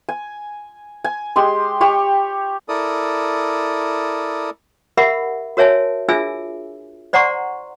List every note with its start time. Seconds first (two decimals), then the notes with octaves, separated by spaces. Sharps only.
0.09 G#5
1.04 G#5
1.36 G#3 G4 C6
1.81 G4 C#5 C#6
2.69 E4 A4 A#4 D5 D#6
4.97 G4 A#4 E5 F#5 B5
5.57 F#4 A#4 C#5 E5 G#5 A5
6.09 D4 F4 G#4 E5 G#5 E6
7.13 C5 D5 F#5 A#5 C6 C#6